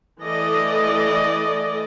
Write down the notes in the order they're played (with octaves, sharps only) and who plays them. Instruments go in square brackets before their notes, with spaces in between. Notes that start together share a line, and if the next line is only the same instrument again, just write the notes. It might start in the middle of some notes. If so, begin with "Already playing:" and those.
[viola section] E3 A3 A4 D5 D#5